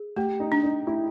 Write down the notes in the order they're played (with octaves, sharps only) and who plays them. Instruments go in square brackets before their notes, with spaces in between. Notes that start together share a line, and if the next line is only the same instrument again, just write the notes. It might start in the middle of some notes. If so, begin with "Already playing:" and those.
Already playing: [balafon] G#4
[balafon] A3 [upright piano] G4
[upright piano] D#4
[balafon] D4
[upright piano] D#4
[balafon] A3 [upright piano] E4